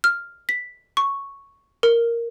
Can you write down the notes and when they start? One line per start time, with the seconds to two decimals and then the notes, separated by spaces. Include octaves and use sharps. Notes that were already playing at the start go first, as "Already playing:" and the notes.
0.04 F6
0.49 B6
0.97 C#6
1.83 A#4